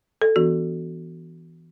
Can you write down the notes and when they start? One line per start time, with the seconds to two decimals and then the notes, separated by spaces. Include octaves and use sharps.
0.22 A4
0.36 E3 B3 D4 F#4